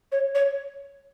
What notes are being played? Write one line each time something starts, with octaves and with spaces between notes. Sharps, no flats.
C#5
C#5